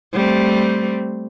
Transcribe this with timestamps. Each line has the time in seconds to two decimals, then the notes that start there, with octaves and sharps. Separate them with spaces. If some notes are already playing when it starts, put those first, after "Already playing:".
0.13 G3 A3 C4